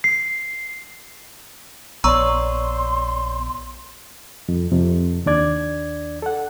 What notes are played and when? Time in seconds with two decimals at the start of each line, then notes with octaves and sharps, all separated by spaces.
0.04 C7
2.04 A#1 B3 C#5 D5 A#5 C6 C#6 E6
4.49 F2
4.71 F2 C3
5.26 D#2 D4 D5 G#6
6.22 A4 F#5